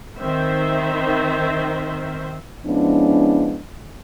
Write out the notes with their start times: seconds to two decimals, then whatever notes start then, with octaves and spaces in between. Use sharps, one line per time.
0.20 D#3 C4 C5 E5
2.66 F3 G#3 B3 C#4 D4 E4